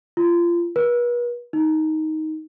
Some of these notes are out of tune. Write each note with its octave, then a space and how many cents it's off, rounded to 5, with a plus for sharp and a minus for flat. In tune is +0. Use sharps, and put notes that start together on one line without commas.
F4 -25
B4 -40
D#4 +10